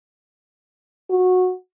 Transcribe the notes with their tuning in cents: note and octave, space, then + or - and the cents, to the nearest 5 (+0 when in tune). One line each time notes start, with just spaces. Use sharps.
F#4 -15